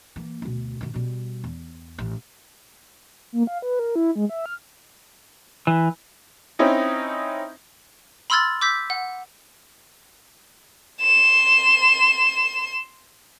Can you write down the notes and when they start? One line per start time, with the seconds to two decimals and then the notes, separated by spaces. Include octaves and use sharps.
0.16 E3 A#3
0.42 D2 B2
0.81 B2 D#3
0.94 B2 G3
1.44 E2
1.98 A1
3.32 A#3
3.47 F5
3.62 B4
3.79 A#4
3.96 E4
4.15 G#3
4.29 E5
4.46 F6
5.67 E3
6.59 C4 C#4 D#4 E4
8.30 B5 C6 E6 F6 G#6 A6
8.61 D6 E6 G6 B6
8.90 F#5
11.01 C6 E7